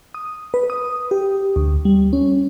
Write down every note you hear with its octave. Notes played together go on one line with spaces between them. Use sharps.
D#6
B4
D#6
G4
D2
G3
C#4